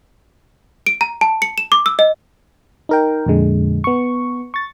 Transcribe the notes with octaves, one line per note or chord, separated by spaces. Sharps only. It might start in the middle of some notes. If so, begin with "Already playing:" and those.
D7
A#5
A5
C#7
E7
D6
E6
D#5
D#4 A#4 G5
F2 A#2 D3 G#3
B3 C#6
C#6 A6